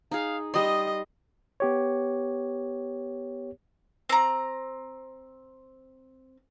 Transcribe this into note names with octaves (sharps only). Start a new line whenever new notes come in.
D#4 G#4 F5
G3 D#5 C6 D#6
B3 G4 C#5
C4 A#5